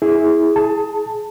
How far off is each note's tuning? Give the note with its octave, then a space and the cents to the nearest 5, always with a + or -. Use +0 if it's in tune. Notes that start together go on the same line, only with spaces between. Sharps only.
E4 -15 G#4 +0
G#4 +20 A5 +15